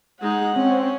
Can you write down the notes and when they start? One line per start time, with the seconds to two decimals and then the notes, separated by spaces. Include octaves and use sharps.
0.21 G#3 D#4 F#5
0.56 C4 C#4